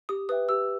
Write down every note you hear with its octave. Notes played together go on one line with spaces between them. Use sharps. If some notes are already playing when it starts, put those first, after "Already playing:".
G4 D#6
B4 E5 G5 D#6
G4 E6